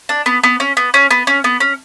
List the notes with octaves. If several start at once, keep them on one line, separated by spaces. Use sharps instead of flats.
D4
B3
B3
C#4
B3
C#4
B3
C#4
B3
C#4